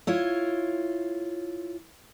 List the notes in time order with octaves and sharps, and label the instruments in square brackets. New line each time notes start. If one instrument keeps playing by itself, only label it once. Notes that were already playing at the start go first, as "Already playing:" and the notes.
[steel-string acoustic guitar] E4 F4 C#5